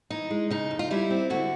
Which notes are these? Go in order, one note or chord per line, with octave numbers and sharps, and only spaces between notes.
E3 D#4
G#3
C#3 D#4
F2
F4
G3 E4
C4
D3 F#4